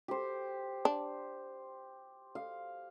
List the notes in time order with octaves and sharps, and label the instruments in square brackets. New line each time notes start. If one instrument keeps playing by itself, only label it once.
[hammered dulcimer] G4 C5
[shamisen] D4
[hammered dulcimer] F5